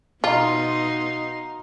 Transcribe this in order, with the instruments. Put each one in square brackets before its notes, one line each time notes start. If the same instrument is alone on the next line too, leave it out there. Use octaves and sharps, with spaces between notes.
[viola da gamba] B2 D#4 [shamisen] F4 [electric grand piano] D#5 F5 A#5 [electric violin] C6